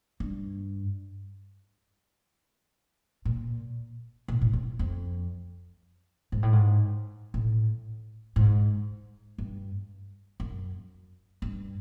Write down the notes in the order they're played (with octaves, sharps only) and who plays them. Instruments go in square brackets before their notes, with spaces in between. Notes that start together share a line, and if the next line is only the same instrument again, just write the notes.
[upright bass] G2
A#2
A#2
A2
E2
F2
G#2
A2
G#2
A2
G#2
G2
F#2
G2